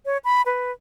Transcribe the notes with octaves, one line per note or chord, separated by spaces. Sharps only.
C#5
B5
B4